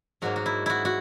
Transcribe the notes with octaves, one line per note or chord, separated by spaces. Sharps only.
G#2 F#3 A#3 D#4 F#4
F#4
E4
E4 F#4
F#4